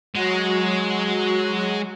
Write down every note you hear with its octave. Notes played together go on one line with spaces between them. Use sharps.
F#3 G#3 F#4